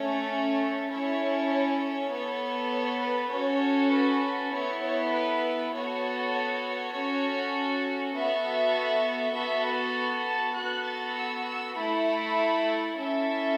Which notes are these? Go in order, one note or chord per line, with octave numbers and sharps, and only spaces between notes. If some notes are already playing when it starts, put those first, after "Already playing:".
Already playing: A3 C#4 A4 C#5
C#4 E4 A4 C#5
C#5
B3 A4
C#5
B4
C#4 F#4 A4 C#5
B4
B4
B3 E4 A4 C#5
C#5
B4
B3 F#4 A4 C#5
C#5
C#4 F#4 A4
B3 F#4 A4 E5
B3 F#4 A4 E5
B4
A5
B3 F#4 A4 F#6
A6
E6
E6
A3 E4 A4 B5
C#4 E4 A4 E5